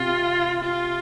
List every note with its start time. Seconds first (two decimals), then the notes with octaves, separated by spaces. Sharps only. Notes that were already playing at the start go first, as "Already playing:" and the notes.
Already playing: C3 F4
0.63 F4